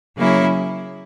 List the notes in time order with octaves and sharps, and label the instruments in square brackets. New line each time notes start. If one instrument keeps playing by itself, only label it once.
[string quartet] C#3 F#3 A#3 C#4 E4